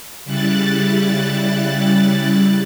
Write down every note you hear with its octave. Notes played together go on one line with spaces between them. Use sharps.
C#3 G3 E4 F#6 A6